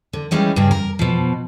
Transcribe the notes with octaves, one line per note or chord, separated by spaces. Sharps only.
D3
E3 G3 G#3 C#4 D#4
G2 C#3 G#4
A#4
B2 F3